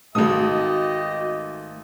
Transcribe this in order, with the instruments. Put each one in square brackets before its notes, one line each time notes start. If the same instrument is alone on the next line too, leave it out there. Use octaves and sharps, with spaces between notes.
[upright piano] G#1 D#6 [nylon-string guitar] A3 C4 D#4 [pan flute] F#4 [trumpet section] G4 D#5